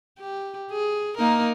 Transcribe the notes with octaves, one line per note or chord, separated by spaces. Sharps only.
G4
G#4
A#3 D#4 A#4